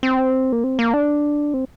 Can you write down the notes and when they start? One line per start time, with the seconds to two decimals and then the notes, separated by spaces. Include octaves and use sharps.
0.03 C4
0.52 A#3
0.64 C4
0.79 A#3
0.93 D4
1.54 C4